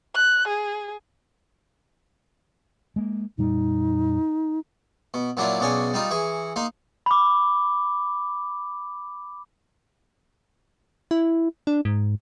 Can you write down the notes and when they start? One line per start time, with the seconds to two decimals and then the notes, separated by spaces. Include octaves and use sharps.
0.15 F#6
0.48 G#4
2.96 G#3 A#3
3.38 F2 A#2 G3 D#4
5.14 B2
5.37 A#2 F#3 D4 E4 F4
5.60 B1 C#3 D4 C#5 G#5
5.94 G3 D#4 F4
6.11 E3 G#4 C#6
6.56 A#3 D#4 C6
7.06 B5 D6
11.11 E4
11.67 D4
11.85 G#2